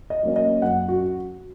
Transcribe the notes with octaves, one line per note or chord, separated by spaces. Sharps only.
D#5
F#3 A#3 C#4
D#5
F#2 F#5
F#4